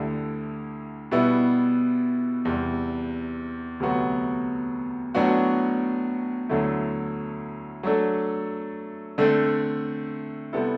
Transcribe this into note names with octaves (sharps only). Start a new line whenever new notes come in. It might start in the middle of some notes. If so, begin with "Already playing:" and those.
Already playing: D2 D3 A3 E4 G4
B2 G3 B3 E4
E2 C3 G3
D2 C3 F#3 B3 F#4
A2 F#3 B3 D4 F#4
D2 D3 F#3 A3 E4
F#3 A3 D4 A4
D3 A3 C4
C3 G3 B3 E4 A4